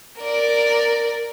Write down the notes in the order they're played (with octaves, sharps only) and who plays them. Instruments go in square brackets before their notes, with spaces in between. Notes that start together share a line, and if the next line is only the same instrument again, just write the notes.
[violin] A#4 D5